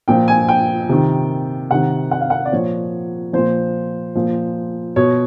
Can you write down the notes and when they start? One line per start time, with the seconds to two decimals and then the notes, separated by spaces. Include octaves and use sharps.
0.08 A#2 F3 G5
0.28 G#5
0.48 G5
0.89 C3 D#3
1.71 C3 D#3 F#5
2.11 F#5
2.21 F5
2.30 F#5
2.45 D5
2.52 A#2 F3 C#5
3.33 A#2 F3 C5
4.15 A#2 F3
4.96 B2 C#5